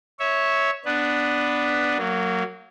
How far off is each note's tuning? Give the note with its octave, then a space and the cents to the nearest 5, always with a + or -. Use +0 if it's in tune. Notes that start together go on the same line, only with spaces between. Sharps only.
C#5 +0 E5 -15
B3 +0 D4 +0 B4 +0
F#3 +0 A#3 -25